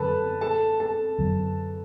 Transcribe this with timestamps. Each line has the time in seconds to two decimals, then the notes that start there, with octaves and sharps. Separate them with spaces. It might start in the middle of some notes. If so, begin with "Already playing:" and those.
Already playing: F#2 D3 F#3 A4 B4 A5 B5
0.41 A4 A5
0.80 A4 A5
1.18 F#2 D3 F#3 B3